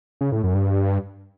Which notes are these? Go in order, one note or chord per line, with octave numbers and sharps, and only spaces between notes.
C#3
A2
F#2
G2